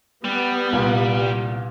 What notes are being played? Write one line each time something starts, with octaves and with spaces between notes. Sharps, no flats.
G3 B3
C2 A#2